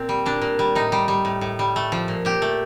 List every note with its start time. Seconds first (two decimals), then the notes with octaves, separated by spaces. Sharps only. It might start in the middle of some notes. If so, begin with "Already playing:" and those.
Already playing: A#2 C4
0.09 G3
0.26 A#2 D4
0.41 A#2
0.59 G3
0.75 A2 D#4
0.92 G3
1.08 G3
1.25 A2
1.41 A2
1.59 G3
1.76 A3
1.92 F3
2.08 A#2
2.25 A#2 G4
2.42 A3